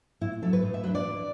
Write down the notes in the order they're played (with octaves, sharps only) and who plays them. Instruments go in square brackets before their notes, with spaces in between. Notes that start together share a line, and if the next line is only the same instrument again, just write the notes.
[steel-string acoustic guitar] A2 E4
F#3 D4 A4
B4
A2
E5
F#3 B4
D4
D5
E3